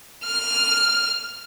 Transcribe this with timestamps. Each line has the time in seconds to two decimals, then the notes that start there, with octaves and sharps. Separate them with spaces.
0.23 F6